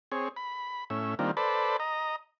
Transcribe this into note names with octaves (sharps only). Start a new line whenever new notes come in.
C4 G#4 C#5
B5
A2 C#4 E5
D#3 G3 A#3 C4 D4 F4
A4 B4 C5 D5 A5 B5
D#5 A#5